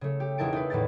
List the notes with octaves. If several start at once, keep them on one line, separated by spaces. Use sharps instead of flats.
C#3 A3
G4
E1 D#4 E4 A#4 A5 D7
D#4 B4
E2 A2 D#3 G4 A6